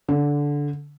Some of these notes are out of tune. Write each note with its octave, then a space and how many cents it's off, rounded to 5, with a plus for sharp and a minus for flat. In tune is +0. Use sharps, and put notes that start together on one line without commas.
D3 -15